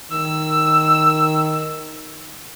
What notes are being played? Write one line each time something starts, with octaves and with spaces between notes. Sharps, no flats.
D#3 E6